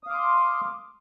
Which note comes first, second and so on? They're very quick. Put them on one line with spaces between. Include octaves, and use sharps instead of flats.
D#6 F5 D6 C6